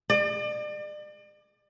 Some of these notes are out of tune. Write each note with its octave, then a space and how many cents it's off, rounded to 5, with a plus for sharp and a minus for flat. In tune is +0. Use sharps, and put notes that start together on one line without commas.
D5 +40